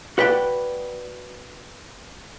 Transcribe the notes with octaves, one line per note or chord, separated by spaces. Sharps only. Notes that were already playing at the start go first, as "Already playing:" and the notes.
F#4 B4 D5 G5